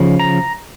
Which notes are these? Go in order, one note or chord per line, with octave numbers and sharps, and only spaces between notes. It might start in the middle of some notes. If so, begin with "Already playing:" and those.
Already playing: C#3 F3
A#5